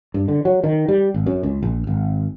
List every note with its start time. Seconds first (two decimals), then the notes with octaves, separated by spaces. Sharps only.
0.14 G2
0.28 D3
0.45 F#3
0.64 D#3
0.88 G3
1.14 G#1
1.26 F#2
1.43 C#2
1.63 A#1
1.87 G#1